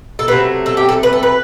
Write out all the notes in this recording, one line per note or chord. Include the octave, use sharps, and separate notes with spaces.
A4
C3 F#3 A3 B4
A4
G4
A4
B4
A4
B4